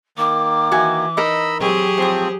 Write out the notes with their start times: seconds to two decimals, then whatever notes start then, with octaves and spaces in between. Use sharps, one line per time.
0.17 D#3 A#3 D6
0.72 E3 F#4 E5 G#5
1.17 D#4 A#4 D#5 B5 E6
1.60 F#3 C4 G4 G#4 C#6
1.98 F3 C4 C5 D#6